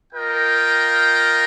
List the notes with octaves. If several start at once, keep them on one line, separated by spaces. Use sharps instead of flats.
F4 A#4 D#5 G5